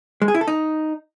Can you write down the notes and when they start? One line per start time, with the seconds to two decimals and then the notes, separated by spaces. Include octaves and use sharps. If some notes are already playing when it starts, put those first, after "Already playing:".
0.22 G#3
0.28 G#4
0.35 E4
0.41 A4
0.48 D#4